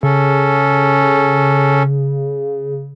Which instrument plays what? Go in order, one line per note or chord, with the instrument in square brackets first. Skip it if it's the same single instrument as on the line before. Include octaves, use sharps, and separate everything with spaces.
[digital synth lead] C#3 [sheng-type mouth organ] C#4 A4